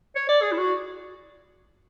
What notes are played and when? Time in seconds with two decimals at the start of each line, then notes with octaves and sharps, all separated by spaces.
0.16 C#5
0.29 D5
0.42 G#4
0.52 E4
0.58 F#4